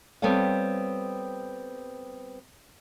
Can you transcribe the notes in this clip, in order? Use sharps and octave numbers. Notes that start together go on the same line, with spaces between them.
G3 B3 C4 A4 C#5 F5